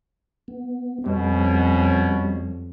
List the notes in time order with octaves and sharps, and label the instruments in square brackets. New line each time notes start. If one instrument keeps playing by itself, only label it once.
[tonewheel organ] B3
[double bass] F2 [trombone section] B2 C#4 [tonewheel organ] G3